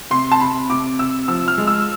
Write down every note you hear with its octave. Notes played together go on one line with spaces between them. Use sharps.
C3 C6
A5
C3 B5
C3 D6
C3 E6
F3 E6
F6
G#3
E6